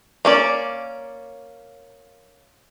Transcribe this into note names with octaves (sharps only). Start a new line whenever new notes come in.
A#3 C#4 D5